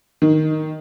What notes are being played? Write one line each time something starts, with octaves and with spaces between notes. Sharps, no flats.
D#3